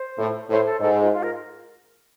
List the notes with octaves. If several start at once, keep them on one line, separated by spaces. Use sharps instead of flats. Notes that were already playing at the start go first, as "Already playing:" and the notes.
Already playing: C5
A2
A2 C5
A4
G#2 A4
F4
F4
A#4